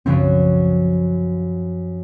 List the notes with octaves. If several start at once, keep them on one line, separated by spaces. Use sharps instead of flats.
B1 F#2 C#3 F3 F#3 C4